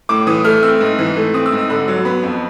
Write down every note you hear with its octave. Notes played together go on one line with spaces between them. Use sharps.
A2 D6
E3 D#6
A3 F6
C4 E6
G#2
E3
A3
C4 D#6
E6
G#2
E6
D3 B5
F#3
B3 B5
F2